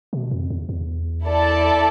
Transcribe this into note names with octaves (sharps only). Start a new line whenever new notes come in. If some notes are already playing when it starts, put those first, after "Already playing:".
B2
F2
E2
E2
E4 A4 D5 A5